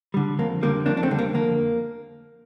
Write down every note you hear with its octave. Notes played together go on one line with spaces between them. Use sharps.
D3 G3
F2 A#3
D3 G3 A#3
F2 A#3 D4
D4
A3 C4
D3 G3
A#3
F2 A#3